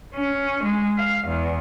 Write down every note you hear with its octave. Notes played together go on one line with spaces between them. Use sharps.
C#4
G#3
F5
E2